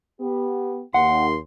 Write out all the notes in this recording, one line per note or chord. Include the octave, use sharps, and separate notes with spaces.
B3 G4
D#2 F#5 C6